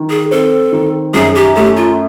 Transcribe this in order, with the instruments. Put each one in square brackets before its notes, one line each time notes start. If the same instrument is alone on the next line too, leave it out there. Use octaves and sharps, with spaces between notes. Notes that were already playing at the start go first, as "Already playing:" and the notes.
Already playing: [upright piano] D#3
[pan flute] G#4
[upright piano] C4 [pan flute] A4
[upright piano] D#3
[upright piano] F#2 [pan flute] G#4
[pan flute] G4
[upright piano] A3 [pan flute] G4
[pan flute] F4